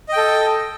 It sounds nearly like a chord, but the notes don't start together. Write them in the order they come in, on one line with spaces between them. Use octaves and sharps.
D#5 G5 A4